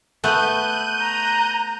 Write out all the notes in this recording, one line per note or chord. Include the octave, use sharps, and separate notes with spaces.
A3 B3 F#6 G6 D#7
A#5